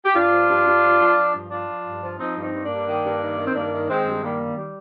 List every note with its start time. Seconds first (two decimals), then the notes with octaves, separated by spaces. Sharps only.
0.04 G4
0.14 G2 D4 F4
0.31 F3
0.48 G2
0.65 G2
0.82 F3
0.99 F3
1.16 F3
1.33 G2
1.50 F3 D4 F4
1.68 F3
1.84 G2
2.01 F3
2.18 F3 C4 D#4
2.35 G2
2.41 C4 D#4
2.53 G2
2.64 A#3 D4
2.70 G2
2.87 D#3
3.03 G2
3.21 D#3
3.37 D#3
3.46 C4
3.54 G2 A#3 D4
3.72 D#3
3.88 D#3 G#3 C4
4.06 G2
4.22 D#3 G3 A#3
4.40 D#3
4.56 G3